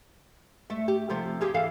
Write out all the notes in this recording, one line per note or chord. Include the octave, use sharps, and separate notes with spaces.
A3 E5
G4
C3 F3 A3
G4 G#4 F5
E3 A4 F5